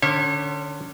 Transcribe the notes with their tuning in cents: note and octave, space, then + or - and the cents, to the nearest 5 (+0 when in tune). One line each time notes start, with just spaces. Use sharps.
D3 +25 C#4 +25 C#5 -40